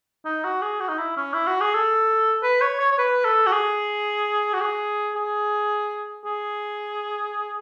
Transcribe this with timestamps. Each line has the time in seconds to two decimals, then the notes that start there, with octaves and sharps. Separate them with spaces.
0.25 D#4
0.44 F#4
0.62 G#4
0.80 F#4
0.88 D#4
0.98 E4
1.17 C#4
1.34 E4
1.47 F#4
1.61 G#4
1.74 A4
2.43 B4
2.61 C#5
2.80 C#5
2.92 C#5
2.98 B4
3.25 A4
3.46 F#4
3.52 G#4
4.53 F#4
4.61 G#4
5.15 G#4
6.25 G#4